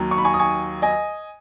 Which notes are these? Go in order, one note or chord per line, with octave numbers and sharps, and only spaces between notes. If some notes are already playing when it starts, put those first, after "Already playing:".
Already playing: D#2 D#3 F#3
C#6
B5
G#5 C#6
D#6
G#5 C#6
D#5 G#5